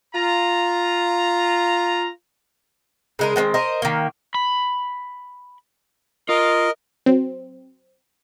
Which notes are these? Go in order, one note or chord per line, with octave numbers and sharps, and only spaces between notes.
F4 A#5
C#3 G#3 A#4
D#3 G#3 B3 C4
A#4 C5 D#5
D#3 A#3
B5
F4 A#4 D#5
F#3 C4